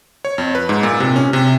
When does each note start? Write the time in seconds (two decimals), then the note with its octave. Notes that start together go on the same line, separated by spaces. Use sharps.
0.25 C#5
0.38 F2
0.55 B4
0.69 G#2
0.83 A#2
1.00 C3
1.16 C#4
1.33 C3